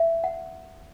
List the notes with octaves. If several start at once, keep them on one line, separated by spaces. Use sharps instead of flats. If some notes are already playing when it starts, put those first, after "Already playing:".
Already playing: E5
F#5